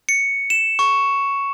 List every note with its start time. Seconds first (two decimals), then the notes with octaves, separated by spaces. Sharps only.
0.09 C#7
0.50 E7
0.79 C#6